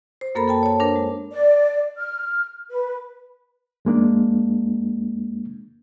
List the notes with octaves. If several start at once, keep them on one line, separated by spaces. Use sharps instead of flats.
C5
F#2 A#3 A4 A#4 A#5 B5
A4 G5 A5
C#5 A5
D4 A#4 C5
G#3
D5
F6
B4
F2 G#3 A#3 D4